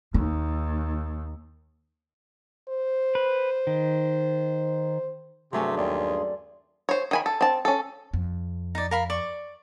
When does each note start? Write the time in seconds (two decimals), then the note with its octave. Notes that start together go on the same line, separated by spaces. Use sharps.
0.14 D#2 D#4
2.69 C5
3.15 B4
3.67 D#3
5.53 G2 C3 F#3 A3 C#4 G#4 C6
5.77 D#2 D5 G5
6.89 C5 C#5
7.11 D#3 G#5 B5
7.26 A4
7.41 C4 A5
7.65 C#4 A4
8.13 F2
8.75 D#4 D5
8.91 A#4 F5 B5
9.10 D5 C#6